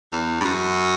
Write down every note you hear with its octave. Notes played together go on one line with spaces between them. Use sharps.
E2
G2
F#2